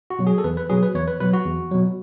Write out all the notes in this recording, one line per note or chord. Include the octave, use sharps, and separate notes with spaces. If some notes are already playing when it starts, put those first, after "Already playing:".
F#4
B2 F#3
G#4
A4
E2 B4
B4
B2 F#3 G#4
B4
E2 C#5
B4
B2 F#3 B4
F#4
E2
B2 F#3